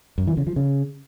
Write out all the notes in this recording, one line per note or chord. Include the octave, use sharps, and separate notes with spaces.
F#2
E3
C#3
F3
C#3